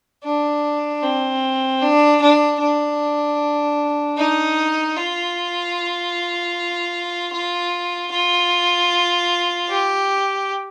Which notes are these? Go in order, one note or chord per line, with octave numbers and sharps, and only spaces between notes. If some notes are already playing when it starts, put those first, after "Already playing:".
D4
C4
D4
D4
D4
D#4
F4
F4
F4
G4